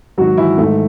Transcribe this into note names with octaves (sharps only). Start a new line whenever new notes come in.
G#2 D#3 F#3 F#4
E3 E4
G#2 D#3 A3